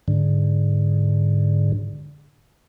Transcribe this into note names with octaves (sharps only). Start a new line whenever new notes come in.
G#2 D3